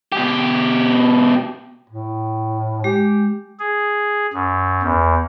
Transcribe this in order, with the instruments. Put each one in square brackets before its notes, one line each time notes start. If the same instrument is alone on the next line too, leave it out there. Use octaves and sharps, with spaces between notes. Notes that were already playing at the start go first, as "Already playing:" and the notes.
[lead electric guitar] B2 G4
[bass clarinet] A2
[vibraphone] G#3 [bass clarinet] G4
[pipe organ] G#4
F#2
E2